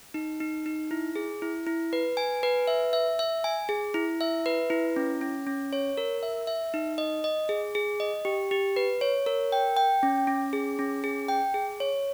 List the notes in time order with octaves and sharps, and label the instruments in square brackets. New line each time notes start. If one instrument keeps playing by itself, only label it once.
[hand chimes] D#4
D#4
D#4
E4
G#4
E4
E4
B4
G#5
B4
E5
E5
E5
G#5
G#4
E4
E5
B4
E4
C#4
C#4
C#4
C#5
A#4
E5
E5
D#4
D#5
D#5
G#4
G#4
D#5
G4
G4
B4
C#5
A#4
G5
G5
C#4
C#4
G#4
C#4
G#4
G5
G#4
C#5